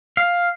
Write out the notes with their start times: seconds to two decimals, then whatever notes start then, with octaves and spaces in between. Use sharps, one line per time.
0.17 F5